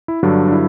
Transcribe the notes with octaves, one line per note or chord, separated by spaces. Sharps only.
E4
G2 D3 F#3 D4
D4
E4